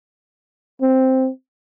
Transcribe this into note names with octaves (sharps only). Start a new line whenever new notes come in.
C4